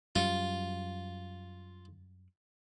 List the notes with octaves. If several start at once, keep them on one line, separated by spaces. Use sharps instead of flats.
F#2 G3 F4